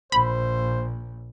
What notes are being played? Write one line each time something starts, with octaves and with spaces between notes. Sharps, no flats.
A#1 C5 B5